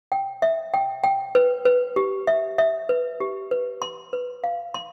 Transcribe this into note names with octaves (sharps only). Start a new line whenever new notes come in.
G5
E5
G5
G5
B4
B4
G4
E5
E5
B4
G4
B4
C6
B4
F5
C6